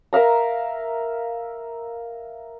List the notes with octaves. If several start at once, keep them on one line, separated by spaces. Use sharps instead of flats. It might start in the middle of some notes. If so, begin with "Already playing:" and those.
A#4 E5 F5 A#5